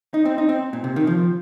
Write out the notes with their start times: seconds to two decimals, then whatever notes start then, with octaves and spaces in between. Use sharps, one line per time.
0.14 D#4
0.25 C4
0.38 D#4
0.49 C4
0.73 A#2
0.84 C3
0.96 D#3
1.07 F3